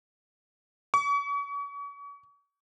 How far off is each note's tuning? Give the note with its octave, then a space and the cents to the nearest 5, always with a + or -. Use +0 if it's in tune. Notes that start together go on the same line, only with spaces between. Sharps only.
C#6 +40